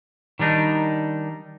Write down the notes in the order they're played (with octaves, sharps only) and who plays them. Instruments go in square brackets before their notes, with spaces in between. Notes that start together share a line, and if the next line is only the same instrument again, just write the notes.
[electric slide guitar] D#3 G3 D4 D#4